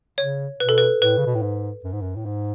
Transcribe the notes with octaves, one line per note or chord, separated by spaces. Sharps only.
C#3 C#5
B2 B4
A4
B4
A2 B4
C#3
B2
A2
G#2
F#2
G#2
F#2
A2
G#2